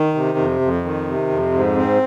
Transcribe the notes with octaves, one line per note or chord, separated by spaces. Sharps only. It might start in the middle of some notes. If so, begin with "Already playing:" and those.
Already playing: D#3
C3
F2
F2
D#3
C3
F2
G#2
C4